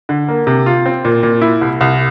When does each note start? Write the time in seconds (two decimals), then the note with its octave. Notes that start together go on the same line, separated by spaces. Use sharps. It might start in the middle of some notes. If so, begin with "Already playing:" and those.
0.09 D3
0.28 A#3
0.47 C3
0.66 F4
0.86 C4
1.05 A#2
1.23 A#2
1.42 E4
1.61 C2
1.81 C2